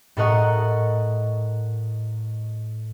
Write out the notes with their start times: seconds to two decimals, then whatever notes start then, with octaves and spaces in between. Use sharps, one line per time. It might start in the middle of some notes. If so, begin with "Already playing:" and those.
0.17 A2 A4 A#4 D#5 F#5 C#6